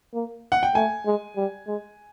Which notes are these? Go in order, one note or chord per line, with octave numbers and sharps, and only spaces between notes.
A#3
F#5
G5
A3 G#5
G#3
G3
G#3